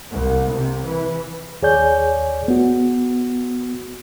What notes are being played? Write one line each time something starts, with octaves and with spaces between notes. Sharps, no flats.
C2
C3
E3
D#2 G#4 C#5 D5 G#5 G6
B3 F#4